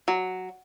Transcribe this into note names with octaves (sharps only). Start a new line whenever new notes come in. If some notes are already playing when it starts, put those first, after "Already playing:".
F#3